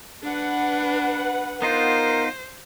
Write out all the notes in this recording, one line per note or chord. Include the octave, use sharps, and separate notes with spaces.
D4 B4 F#5
B3 D#4 F4 A#4 C5